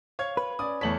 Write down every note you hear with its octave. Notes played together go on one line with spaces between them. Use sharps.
C#5 F5 G#6
B4
C#4 D5 D#6
E2 A3 C#5 A5 B6 F#7